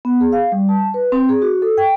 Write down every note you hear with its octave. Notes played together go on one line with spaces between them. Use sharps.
B3
G#4
F5
G3
A5
B4
C4
G#4
F#4
A4
G5